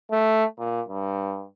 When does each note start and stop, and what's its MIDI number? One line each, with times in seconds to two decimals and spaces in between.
0.11 0.44 57
0.59 0.81 46
0.89 1.45 43